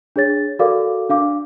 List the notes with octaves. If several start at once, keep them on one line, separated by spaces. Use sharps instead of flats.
D4 G#4 C#5 A6
F#4 A4 A#4 D5 F5 D6
D4 F5 D6